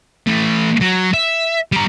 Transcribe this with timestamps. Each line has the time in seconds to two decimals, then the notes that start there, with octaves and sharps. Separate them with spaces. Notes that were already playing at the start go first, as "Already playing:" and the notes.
0.27 E3 A3
0.81 F#3
1.14 E5
1.72 G3 A#5